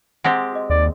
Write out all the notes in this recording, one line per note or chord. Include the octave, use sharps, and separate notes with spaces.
G#3 C4 G4 F#5 A#5 B5
F#4 D#5
D#2 D5